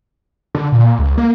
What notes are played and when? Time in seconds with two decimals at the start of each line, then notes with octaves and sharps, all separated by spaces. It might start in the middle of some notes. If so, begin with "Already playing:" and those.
0.55 D3
0.72 A#2
0.99 C#2
1.18 A#3